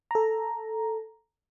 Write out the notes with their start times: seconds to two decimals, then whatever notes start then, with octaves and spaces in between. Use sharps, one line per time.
0.11 A4 A#5